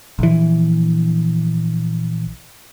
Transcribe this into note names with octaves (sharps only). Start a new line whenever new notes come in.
A#1 E3